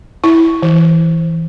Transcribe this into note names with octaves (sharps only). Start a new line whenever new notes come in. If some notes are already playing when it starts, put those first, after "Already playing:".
E4
E3